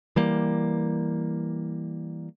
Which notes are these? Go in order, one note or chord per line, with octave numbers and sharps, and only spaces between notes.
E3 G3 A#3